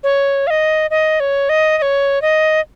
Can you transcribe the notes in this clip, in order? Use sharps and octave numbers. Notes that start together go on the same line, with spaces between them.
C#5
F5
D#5
D#5
C#5
D#5
D#5
C#5
D#5